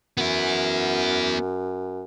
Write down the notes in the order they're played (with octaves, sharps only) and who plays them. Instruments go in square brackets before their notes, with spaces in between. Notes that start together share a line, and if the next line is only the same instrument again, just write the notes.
[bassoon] F#2 [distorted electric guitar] B3 E4